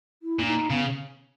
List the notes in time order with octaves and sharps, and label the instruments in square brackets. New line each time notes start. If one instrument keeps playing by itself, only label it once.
[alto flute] E4
[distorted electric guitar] A#2 [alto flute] C#4
[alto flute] D#4
[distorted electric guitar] C#3 [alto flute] B3